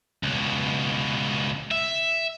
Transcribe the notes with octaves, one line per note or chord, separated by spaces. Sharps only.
C#2 B2
E5